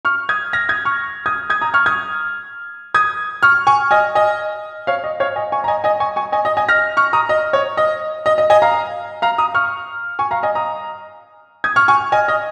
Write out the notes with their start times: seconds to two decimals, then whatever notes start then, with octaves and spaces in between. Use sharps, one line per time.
0.05 C#6 F6
0.29 D#6 G#6
0.53 F6 A#6
0.69 D#6 G#6
0.85 C#6 F6
1.26 D#6 G#6
1.50 D#6 G#6
1.61 A#5 D#6
1.74 C#6 F6
1.86 D#6 G#6
2.94 D#6 G#6
3.43 C#6 F6
3.67 G#5 C#6
3.91 D#5 G#5
4.15 D#5 G#5
4.87 C#5 F5
5.04 D#5
5.20 C#5 F5
5.36 D#5 G#5
5.52 G#5 C#6
5.64 A#5
5.68 D#5 G#5
5.84 D#5 G#5
6.00 G#5 C#6
6.16 G#5 C#6
6.32 D#5 G#5
6.45 D#5
6.57 D#5 G#5
6.69 F6 A#6
6.97 C#6 F6
7.13 A#5 D#6
7.29 D#5
7.53 C#5
7.77 D#5
8.26 D#5
8.38 D#5
8.50 D#5 G#5
8.62 F5 A#5
9.22 F5 A#5
9.38 A#5 D#6
9.54 C#6 F6
10.19 G#5 C#6
10.31 F5 A#5
10.43 D#5 G#5
10.55 A#5 D#6
11.64 D#6 G#6
11.76 C#6 F6
11.88 G#5 C#6
12.12 D#5 G#5
12.28 D#5